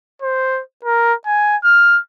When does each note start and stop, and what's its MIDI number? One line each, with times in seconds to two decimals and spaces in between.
0.22 0.61 72
0.85 1.14 70
1.26 1.57 80
1.64 2.00 89